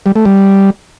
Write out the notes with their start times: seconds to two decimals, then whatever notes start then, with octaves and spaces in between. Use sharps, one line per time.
0.06 G3
0.16 A3
0.25 G3